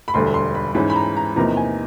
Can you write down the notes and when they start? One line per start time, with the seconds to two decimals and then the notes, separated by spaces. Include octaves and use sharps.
0.08 B5
0.14 E1 D2 D3 G3 C6
0.34 C6
0.55 B5
0.75 G#2 E3 G#3 C#4 B5
0.90 B5
0.96 A#5
1.17 A#5
1.36 E2 C3 F3 A#3 D#4 A#5
1.57 G#5